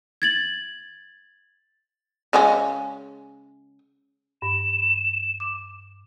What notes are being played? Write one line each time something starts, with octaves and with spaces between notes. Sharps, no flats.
G#6 A6 F#7
C#3 G#3 C#4
G2 E7
D6